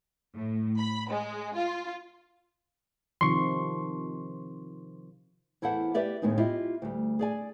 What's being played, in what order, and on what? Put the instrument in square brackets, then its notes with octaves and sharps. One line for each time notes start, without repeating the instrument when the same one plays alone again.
[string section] A2
B5
G#3
F4
[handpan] C3 D#3 F3 [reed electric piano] C6 C#6
[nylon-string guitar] E2 E4 A4 C5 F#5
G4 B4 D5 E5
D#2 A2 G#3 B3 D#4
E4 F4 G4 D#5
D2 G3
G#4 D5 G#5